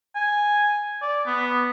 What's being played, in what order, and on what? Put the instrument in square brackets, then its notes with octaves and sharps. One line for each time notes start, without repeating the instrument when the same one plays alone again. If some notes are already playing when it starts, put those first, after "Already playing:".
[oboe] G#5
D5
B3